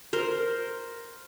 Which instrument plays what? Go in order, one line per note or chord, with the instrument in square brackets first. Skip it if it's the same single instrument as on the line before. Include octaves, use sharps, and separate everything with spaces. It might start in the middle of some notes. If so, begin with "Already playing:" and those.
[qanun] A#4 C5